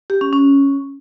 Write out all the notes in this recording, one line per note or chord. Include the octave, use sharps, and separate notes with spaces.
G4
C#4
C#4